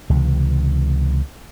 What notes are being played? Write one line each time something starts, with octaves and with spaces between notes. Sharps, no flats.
C#2 C3 E3